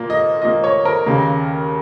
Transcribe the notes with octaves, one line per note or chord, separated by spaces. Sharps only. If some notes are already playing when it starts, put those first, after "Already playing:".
Already playing: A#2 A#3
D#5
A#2 A#3 D#5
C#5
A#4
D#2 C#3 A#3